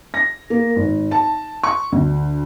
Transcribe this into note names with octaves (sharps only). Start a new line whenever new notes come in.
A#6
A#3
G#1
A5
C#6
D2